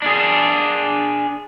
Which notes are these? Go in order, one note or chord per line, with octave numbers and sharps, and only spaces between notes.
D4 G#4